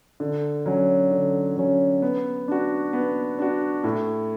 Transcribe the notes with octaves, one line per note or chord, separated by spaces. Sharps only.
D3
F#3 C#4
D3
F#3 C#4
B3
D4 F#4
B3
D4 F#4
A2